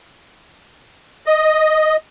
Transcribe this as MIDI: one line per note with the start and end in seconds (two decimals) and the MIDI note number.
1.26 1.96 75